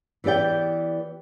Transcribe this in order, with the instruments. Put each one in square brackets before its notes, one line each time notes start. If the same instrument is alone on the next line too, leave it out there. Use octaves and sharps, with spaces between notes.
[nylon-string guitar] E3 B3 G4 D5 G5